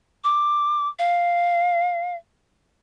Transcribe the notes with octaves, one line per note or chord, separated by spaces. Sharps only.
D6
F5